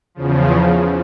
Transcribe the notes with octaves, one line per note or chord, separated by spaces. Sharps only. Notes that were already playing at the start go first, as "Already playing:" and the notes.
E2 C#3 F3